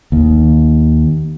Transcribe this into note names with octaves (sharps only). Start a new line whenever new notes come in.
D#2